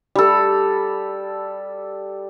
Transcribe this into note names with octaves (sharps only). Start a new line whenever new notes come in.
G3 A4